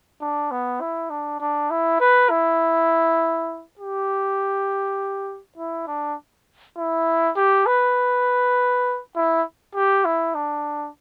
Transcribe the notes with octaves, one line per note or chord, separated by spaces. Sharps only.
D4
B3
E4
D4
D4
E4
B4
E4
G4
E4
D4
E4
G4
B4
E4
G4
E4
D4